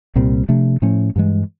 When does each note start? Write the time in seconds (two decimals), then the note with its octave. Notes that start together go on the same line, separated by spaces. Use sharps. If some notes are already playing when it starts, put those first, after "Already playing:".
0.15 C2 A#2 G3 C4
0.49 C3 F3 A3 D4
0.82 A2 F3 A3 C#4
1.16 G2 E3 G#3